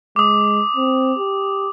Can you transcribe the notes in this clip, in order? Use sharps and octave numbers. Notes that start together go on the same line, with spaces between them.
G#3 D6 D#6
C4
G4